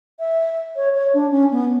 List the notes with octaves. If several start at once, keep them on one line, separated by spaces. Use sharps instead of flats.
E5
C#5
C#5
D4
C#4
B3